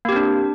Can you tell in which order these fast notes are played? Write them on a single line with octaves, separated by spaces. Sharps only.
A#3 G4 C4 D4